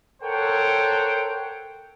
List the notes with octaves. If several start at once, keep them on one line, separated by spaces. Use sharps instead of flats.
A4 A#4 C5 C#5 F#5 G5